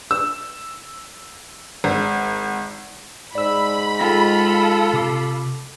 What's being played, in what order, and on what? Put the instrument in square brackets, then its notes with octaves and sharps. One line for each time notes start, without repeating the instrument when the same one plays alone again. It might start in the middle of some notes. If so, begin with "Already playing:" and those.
[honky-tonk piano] E6
G#1
[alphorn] G#2 [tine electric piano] D5 E6 [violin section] B5
[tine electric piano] G#3 G5 A#6 [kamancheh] F4 A4
[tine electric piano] C3 D6 C7